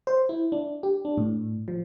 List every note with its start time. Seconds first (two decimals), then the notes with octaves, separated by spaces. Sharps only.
0.07 C5
0.29 E4
0.52 D4
0.83 G4
1.05 D4
1.18 A2
1.68 F3